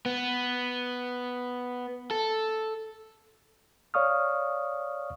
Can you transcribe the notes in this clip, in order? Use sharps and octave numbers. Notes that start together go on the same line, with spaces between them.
B3
A4
C#5 D5 F5 C#6 D#6 F6